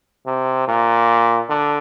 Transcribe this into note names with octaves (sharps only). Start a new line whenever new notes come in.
C3
A#2
D3